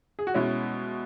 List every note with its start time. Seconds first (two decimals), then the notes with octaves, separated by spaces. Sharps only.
0.19 G#4
0.27 F#4
0.34 B2 G#3 C#4 E4